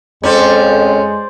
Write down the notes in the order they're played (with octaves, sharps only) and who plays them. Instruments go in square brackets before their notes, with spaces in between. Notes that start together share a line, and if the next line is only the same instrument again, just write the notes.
[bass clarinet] F2 [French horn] G#3 [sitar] C#4 A4 [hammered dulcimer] C5 D5